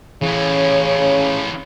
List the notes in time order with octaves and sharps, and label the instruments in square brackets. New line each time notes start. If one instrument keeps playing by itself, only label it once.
[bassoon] C#3 [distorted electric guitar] E3 C#4 [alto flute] C#5